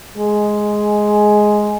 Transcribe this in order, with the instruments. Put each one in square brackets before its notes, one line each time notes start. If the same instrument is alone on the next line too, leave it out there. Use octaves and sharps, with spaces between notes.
[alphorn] G#3